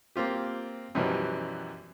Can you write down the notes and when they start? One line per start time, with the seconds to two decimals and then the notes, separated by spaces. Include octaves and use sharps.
0.16 A#3 C4 F4 G4
0.95 F#2 B2 E3 F3 G3 C#4